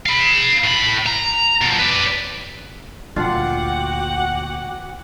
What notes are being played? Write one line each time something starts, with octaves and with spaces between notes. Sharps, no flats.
F5 B5
A2 B5
A#5
B2 F3
B4 D5
D2 A#2 D4 F4 F#4 F#5 G5 D6